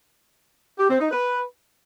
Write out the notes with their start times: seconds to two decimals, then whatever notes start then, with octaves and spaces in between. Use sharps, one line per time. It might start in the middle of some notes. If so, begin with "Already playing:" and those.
0.79 G4
0.90 C4
1.01 D#4
1.11 B4